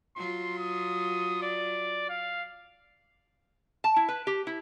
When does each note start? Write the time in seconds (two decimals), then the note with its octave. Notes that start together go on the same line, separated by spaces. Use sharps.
0.17 F#3 F4 C6
0.59 D#6
1.43 D5
2.10 F5
3.84 A5
3.96 E4
4.09 B4
4.27 G4
4.47 E4